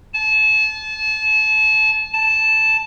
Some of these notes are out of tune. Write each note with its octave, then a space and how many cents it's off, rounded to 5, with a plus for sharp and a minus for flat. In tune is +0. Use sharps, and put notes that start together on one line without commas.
A5 -30
A5 -5